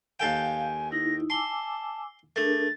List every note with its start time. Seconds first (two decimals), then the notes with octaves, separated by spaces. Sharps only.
0.20 D#2 A4 F5 G5 G#5
0.92 D#4 E4 A#6
1.30 G#5 A5 C6 D6 E6
2.36 A3 D4 G#4 A#4 A6